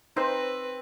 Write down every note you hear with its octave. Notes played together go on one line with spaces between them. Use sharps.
C4 D#4 B4 C5